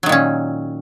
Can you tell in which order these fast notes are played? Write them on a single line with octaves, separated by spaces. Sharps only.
F#3 D#3 A#2 C#4